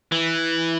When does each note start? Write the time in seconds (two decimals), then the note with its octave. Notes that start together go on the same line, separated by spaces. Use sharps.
0.12 E3